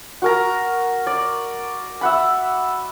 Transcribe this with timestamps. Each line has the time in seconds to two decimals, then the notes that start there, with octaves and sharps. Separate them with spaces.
0.22 F#4 A#4 A#5
1.07 D5
2.01 E5 F#5 B5